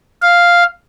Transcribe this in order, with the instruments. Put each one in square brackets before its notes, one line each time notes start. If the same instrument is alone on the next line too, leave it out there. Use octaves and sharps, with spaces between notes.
[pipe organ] F5